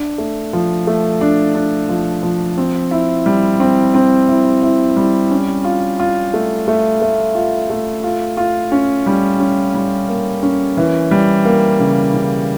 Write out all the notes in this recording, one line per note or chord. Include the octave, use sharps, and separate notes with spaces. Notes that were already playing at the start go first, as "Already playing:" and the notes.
Already playing: D4
A3
F3
A3
D4
D4
F3
F3
C4
E4
G3
C4
C4
E4
E4
G3
C#4
F4
F4
A3
A3
A3
F4
A3
F4
F4
C#4
G3
C#4
G3
A#3
C#4
E3
G3
A#3
C#3
C#3